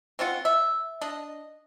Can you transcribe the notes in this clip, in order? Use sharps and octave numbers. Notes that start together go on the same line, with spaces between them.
C4 C#4 F4 F#5
E5
D4 D#5